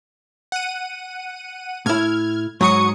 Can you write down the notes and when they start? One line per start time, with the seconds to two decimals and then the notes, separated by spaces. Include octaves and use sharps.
0.52 F#5 D#7
1.86 A2 E4 F6 G#6
2.61 G#2 F#3 C#6 D#6 C#7